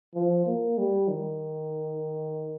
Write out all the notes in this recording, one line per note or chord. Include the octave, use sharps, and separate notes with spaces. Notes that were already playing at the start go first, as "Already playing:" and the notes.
F3
A#3
G3
D#3